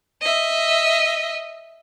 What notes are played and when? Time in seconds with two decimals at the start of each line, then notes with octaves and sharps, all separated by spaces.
0.21 D#5 E5